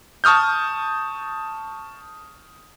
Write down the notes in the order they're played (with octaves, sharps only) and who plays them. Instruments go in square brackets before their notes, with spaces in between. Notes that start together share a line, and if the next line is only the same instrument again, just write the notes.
[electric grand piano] A5 C#6 D#6 F6 G6